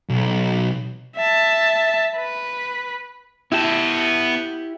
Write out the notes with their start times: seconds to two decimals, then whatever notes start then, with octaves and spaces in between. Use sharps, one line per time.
0.09 B1
1.16 E5 A5
2.17 B4
3.52 B3 E4 G4 A5